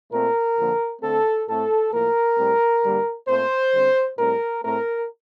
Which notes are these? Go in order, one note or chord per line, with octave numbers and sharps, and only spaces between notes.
A#2 A3 C4 A#4
F2 D3 F3 A#3
D3 A3 C4 A4
A2 A3 C4 A4
A2 F3 A#3 A#4
A2 G3 C4
G2 D3 G3 A#3
A#2 A3 C4 C5
D3 G3 C4
A2 G3 C4 A#4
A2 A3 C4 A#4